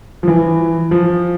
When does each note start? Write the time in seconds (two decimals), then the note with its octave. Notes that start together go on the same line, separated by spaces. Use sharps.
0.23 F3
0.28 E3
0.91 F3